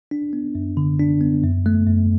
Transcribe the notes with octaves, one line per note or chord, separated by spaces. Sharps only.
D4
B3
F#2
D3
D4
B3
F#2
A3
F#2